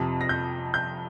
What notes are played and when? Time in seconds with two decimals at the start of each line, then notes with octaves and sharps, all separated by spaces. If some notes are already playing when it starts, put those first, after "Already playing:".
Already playing: F2 C3 F3
0.21 A#6
0.29 G6
0.74 G6